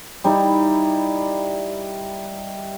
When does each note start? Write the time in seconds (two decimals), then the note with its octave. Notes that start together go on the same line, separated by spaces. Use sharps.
0.24 G3 D#4 E4